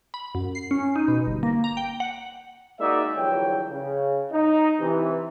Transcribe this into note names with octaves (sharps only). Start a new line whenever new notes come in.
B5
F#2
C7
C#4
D#4
B2
G1
A#3
A#5
G5
F#5
G#3 A#3 D#4 F#4 D5 E5
G1 E2 F3 F#3 C#5 G5
C#3
D#4
C3 E3